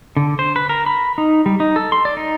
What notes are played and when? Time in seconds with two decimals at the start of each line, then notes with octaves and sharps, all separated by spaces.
0.17 D3
0.39 C5
0.56 B4
0.69 A#4
0.86 B5
1.18 D#4
1.46 G3
1.60 D#4
1.76 A4
1.92 C6
2.05 D5
2.17 D#4